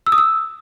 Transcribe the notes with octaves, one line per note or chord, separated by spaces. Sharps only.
E6
D#6
E6